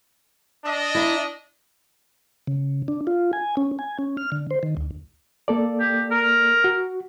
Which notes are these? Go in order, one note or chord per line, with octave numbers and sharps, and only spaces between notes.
D4 D#5
E4 E5 A#5
C#3
D4
F4
G#5
C#4
G#5
C#4
F6
D3
C5
D#3
D2
A#3 A4 D5
G4
A#4
F#4